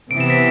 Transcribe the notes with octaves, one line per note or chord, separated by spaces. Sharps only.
C3 E3 B3 D7
E7
B6 D7